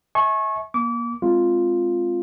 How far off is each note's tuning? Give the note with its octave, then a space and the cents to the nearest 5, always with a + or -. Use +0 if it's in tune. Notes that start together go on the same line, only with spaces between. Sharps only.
E5 -35 G#5 +40 C#6 -25
A#3 +30 D6 -30
G#3 +0 C4 +5 F4 +0